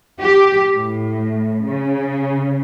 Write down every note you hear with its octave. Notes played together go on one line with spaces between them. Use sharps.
G4
A2
C#3